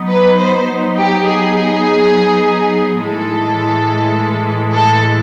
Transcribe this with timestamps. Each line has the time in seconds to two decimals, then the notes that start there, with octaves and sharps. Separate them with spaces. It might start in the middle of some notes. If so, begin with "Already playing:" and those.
Already playing: F#3 B3 D#4
0.11 B4
0.39 C5
0.97 G4
1.26 G#4
2.99 A2 E3 G#3 A4
4.73 A4